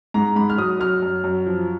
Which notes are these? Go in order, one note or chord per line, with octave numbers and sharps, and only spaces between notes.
G#2 A#5
G#2 B5
F6
F#3 D#6
F#3 F6
F#2
F#2
F3